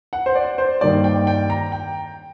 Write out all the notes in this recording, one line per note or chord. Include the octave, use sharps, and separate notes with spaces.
F#5
C5
D5
C5
G2 D#3 G3 A#3 D5
G5
G5
A#5
G5